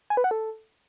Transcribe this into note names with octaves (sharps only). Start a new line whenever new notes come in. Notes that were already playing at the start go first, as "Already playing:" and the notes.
G#5
B4
F#5
A4